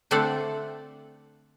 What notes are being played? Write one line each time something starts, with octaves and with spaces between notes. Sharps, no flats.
D3 A3 C4 A4 D5 F#5